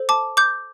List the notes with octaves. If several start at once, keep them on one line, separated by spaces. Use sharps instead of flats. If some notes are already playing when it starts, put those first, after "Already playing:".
Already playing: A4 C5
A5 D6
D6 G6